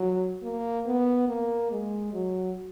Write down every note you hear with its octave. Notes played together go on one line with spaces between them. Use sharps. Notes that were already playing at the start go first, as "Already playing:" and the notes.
Already playing: F#3
A#3
B3
A#3
G#3
F#3